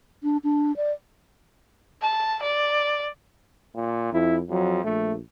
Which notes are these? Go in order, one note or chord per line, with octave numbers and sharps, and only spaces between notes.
D4
D4
D5
A5
D5
A#2
F2 E4
F2 F#3
A#1 A3